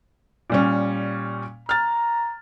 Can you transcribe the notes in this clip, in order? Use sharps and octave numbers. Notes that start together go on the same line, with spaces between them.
A#2 G3 C#4
A#5 F6 A6